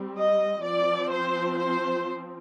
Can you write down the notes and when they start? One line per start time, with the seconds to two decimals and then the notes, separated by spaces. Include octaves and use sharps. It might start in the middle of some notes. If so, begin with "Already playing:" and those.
Already playing: G3 C4
0.18 D#5
0.65 F3 C4 D5
1.12 C5
1.59 C5